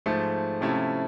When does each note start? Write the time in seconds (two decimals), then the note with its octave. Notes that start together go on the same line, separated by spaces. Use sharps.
0.06 G#2 F3 A3
0.61 C3 F3 A3 C#4 E4